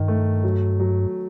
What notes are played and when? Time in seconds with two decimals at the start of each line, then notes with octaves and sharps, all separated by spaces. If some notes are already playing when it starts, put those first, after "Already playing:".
Already playing: G2 D#3
0.08 A3
0.43 F#3
0.80 F#3